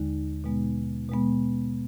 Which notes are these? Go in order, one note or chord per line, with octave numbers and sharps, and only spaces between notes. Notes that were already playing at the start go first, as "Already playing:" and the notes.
Already playing: D#2 D3 G#3 D#4
B2 G#3 B3
B2 G#3 B3